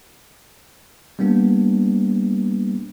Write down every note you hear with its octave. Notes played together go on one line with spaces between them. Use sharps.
G3 A#3 B3 D4